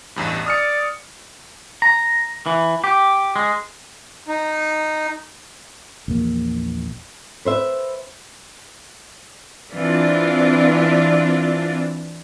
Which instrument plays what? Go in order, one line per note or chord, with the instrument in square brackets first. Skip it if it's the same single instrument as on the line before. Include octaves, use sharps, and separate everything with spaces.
[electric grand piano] A1 E2 G2
[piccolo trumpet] D5 [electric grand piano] D#6 F6 C#7
[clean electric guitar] A#5
E3
G4
G#3
[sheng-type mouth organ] D#4
[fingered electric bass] A#1 E2 A#3
[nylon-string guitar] B4 C5 E5
[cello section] E3 C4 D4 F4